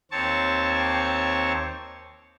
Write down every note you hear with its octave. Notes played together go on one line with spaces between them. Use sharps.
D#2 C4 C#5 A5 C#6